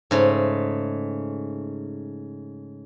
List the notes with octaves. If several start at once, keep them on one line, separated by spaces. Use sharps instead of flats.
G#2 C#3 A3